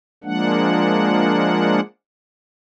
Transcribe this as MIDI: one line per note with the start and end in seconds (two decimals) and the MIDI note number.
0.24 1.80 53
0.24 1.80 56
0.24 1.80 58
0.24 1.80 62
0.24 1.80 78